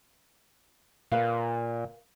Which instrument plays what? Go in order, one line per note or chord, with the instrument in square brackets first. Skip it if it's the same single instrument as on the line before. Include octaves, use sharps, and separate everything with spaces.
[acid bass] A#2 [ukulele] A#4 B4 F5